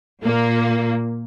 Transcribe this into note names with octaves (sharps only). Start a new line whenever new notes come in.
A#2 A#3